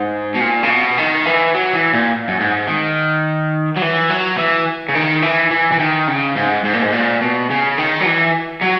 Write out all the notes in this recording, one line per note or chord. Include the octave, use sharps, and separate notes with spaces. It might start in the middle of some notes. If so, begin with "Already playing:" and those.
Already playing: G#2
B2
A#2
C#3
B2
D#3
E3
F#3
E3
A#2
F#2
G#2
D#3
F#3
E3
F#3
E3
C#3
D#3
E3
E3
E3
D#3
C#3
G#2
G#2
A#2
G#2
A#2
B2
C#3
D#3
F#3
E3
F#3